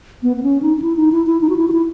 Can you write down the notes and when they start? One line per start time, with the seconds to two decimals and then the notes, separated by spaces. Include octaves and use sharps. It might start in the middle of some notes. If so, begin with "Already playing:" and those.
0.23 B3
0.37 B3
0.43 C#4
0.62 D#4
0.77 D#4
0.82 E4
0.97 D#4
1.12 E4
1.26 E4
1.41 D#4
1.50 F#4
1.56 E4
1.68 F#4
1.72 E4